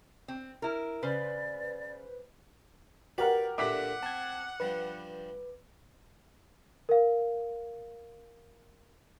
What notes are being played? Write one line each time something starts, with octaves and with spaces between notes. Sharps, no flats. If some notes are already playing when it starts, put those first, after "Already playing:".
C4
E4 A#4
C#3 B4 C5 D5
F#4 G4 A#4 B4 D5 F#5 B5
G2 A#2 D3 G4 E5 F#5 D6 B6
C4 A5 G#6
G2 F3 G3 B4
A#4 F5